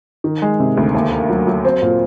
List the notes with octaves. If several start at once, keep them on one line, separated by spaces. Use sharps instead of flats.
D#3
G#3
C3
D2
D#2
A#3
F#3
F#3
C4
A#2